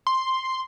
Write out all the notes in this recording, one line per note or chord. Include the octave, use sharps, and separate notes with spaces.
C6